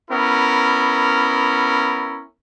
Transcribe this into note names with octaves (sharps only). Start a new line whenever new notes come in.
B3 C#4 E4 A#4